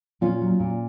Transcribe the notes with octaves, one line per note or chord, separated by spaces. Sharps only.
A#2 C#4 F4
F#3
A#2